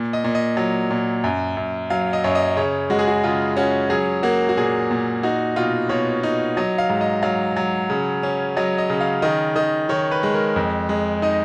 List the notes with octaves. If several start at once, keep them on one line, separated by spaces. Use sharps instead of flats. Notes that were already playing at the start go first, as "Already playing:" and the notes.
Already playing: A#2
D#5
A#2
D#5
F#3
A#2
F#2
F#2
F#3 F5
D#5
F#2 C#5
D#5
C#3 C#5
G#3 F#4
G#4
F#4
C#3 F4
C#4 F#4
F#3 G#4
A#3 F#4
F#4
A#2 G#4
A#2
D#4 F#4
B2 F4
B2 C#5
D#4
F#3 D#5
F5
G#2
D#5
F#3 F5
F#3
C#3
C#4
F#3 D#5
D#5
C#3
F5
D#3 D#5
D#3 D#5
D#3 C#5
B4
G#3
A#4
F2
G#3
D#4 D#5